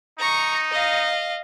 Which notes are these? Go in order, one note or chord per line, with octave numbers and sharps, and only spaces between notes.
D#4 A#5 C#6
D#5 F5